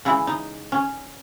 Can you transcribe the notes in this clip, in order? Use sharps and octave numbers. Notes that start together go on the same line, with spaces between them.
C#3 E3 G#3 E4
D#4
C#4